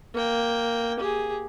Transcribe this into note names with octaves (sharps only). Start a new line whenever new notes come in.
A#3 G5
G4 G#4